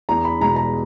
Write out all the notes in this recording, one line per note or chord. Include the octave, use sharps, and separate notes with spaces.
E2 A#5
B5
B2 G#3 A#5
A#5